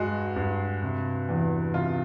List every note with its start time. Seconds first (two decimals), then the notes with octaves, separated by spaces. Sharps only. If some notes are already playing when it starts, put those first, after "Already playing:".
Already playing: G2 G#3 F#4
0.36 G2
0.82 C3
1.28 E2
1.74 C3 F4